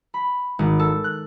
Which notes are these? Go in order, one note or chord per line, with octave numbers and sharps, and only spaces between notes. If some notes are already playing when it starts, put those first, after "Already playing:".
B5
G#1
A4
F#6